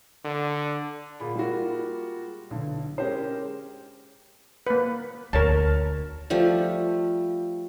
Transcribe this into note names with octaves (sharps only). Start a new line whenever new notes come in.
D3
A#2 G#4 B5
G3 G#3 A#3 F4 F#4
B1 D3
G#3 C#4 G4 A#4 C5
A#3 B4
D2 A#4 C#5 A5
F3 G3 A3